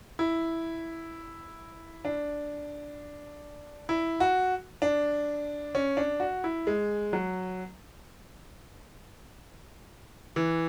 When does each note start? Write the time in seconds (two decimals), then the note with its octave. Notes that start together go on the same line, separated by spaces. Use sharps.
0.19 E4
2.05 D4
3.89 E4
4.20 F#4
4.82 D4
5.75 C#4
5.97 D4
6.20 F#4
6.44 E4
6.67 G#3
7.13 F#3
10.36 E3